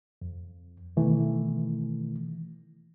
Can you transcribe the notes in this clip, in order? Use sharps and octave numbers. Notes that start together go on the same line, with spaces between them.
F2
B2 D#3 E3 A3